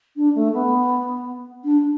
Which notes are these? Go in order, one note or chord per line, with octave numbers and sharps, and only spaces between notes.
D4
A3
B3
D4